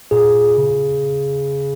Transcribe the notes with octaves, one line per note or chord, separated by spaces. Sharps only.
A#2 G#4
C#3